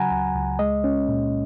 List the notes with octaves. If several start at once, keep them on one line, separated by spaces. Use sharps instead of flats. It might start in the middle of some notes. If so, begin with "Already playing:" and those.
Already playing: C#3 F#3 F#5 G#5 A#5 B5
C#2
C#2
G#3 D#5
C#4
A#2